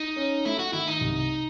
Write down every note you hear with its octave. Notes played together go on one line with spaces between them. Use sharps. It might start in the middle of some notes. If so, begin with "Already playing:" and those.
Already playing: D#4
C#4
A3 E4
F#4
D#3 E4
D#4
C2